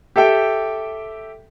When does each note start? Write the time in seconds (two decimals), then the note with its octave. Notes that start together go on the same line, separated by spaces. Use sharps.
0.16 G4 A4 E5 G5